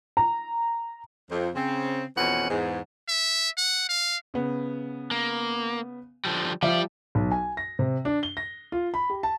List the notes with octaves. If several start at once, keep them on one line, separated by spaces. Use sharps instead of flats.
A#5
F2
C#3 C4
F2 B2 E3 C#4 F#5
E2 G#2
E5
F#5
F5
C#3 B3
A#3
D3 F3 G3
F3 G3 F4 D5 E5
B1
G#5
A#6
C3
D4
G7
A#6
F4
B5
G4
A5